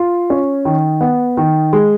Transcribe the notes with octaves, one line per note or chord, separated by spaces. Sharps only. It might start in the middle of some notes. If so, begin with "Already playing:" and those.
Already playing: F4
C#4
D#3
B3
D#3
G#3